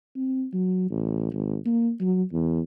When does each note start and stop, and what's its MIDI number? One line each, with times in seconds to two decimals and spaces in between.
0.16 0.46 60
0.53 0.87 54
0.90 1.30 33
1.33 1.56 32
1.65 1.92 58
2.01 2.23 54
2.32 2.60 40